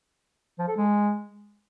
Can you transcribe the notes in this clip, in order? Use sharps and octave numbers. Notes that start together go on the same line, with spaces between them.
F3
A4
G#3